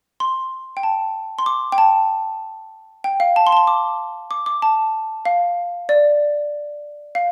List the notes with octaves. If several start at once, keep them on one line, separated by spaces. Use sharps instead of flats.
C6
G5
A5
C6
D6
G5
A5
G5
F5
A5
C6
A5
C6
D6
D6
D6
A5
F5
D5
F5